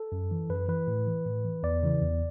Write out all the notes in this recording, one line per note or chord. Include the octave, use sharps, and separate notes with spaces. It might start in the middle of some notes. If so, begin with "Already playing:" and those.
Already playing: A4
F#2
E3
F#2 B4
E3 B4
A2
E3
A2
E3
E2 D5
C#3 E3
E2